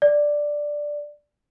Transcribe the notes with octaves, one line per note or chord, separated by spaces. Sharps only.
D5